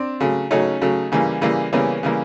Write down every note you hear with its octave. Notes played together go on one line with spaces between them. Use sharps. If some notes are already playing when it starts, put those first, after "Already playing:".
Already playing: C4 D4
C#3 F#3 A3
C#3 F#3 A3 C#4 D#4
C#3 F#3 A3
C#3 E3 G3 A#3
C#3 E3 G3 A#3
C#3 E3 G3 A#3 B3 C#4
C#3 E3 G3 A#3